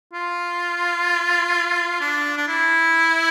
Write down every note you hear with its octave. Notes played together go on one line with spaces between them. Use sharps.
F4
D4
D4
E4